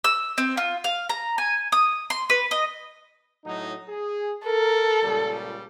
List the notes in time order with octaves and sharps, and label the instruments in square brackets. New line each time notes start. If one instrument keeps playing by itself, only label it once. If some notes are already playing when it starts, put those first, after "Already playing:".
[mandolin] E6
C4
F4
F5
A#5
G#5
D#6
C6
B4
D#5
[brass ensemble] A2 F#3 D#4
G#4
[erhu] A4 [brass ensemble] A#4
[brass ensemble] C#2 A#2 G3